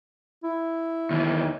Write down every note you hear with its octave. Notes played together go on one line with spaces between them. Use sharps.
E4
D#2 E3